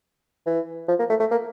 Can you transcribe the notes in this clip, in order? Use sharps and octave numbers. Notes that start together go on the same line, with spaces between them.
E3
F3
A#3
A3
A3
A#3